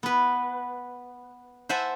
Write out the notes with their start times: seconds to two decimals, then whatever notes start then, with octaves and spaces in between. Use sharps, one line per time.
0.03 B3 B4
1.69 C5 E5 F#5 G#5 A5